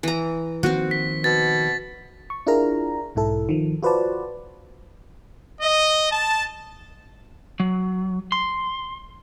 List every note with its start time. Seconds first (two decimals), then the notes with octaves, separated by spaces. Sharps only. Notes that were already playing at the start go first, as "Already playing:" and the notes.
0.03 E3 A#5
0.63 D#3 F3 A#3 C4 F#4
0.91 B6
1.24 B2 A6
2.30 C#6
2.47 D4 E4 F4 G#4 A#4 A#5
3.15 B1 G#2 E4 A4
3.49 D#3 F3
3.83 F4 F#4 B4 C5 D5 A5
5.62 D#5
6.11 A5
7.60 F#3
8.32 C6